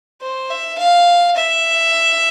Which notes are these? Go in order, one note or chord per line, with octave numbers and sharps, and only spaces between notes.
C5
E5
F5
E5